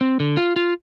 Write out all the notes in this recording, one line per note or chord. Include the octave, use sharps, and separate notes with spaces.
C4
D3
F4
F4